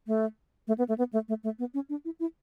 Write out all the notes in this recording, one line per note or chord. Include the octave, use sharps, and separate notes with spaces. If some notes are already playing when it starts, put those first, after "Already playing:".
A3
A3
B3
A3
B3
A3
A3
A3
B3
C#4
D4
E4
E4